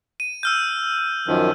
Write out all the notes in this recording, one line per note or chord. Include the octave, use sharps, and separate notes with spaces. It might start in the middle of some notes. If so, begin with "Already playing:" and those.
D#7
E6 F6 G6
F#2 D#3 F3